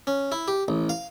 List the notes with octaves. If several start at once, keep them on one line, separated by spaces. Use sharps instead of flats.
C#4
E4
G4
A1
F5